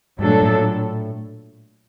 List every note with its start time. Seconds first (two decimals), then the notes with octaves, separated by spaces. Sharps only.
0.19 G2 A#2 F#3 A3 D4 A4
0.42 A2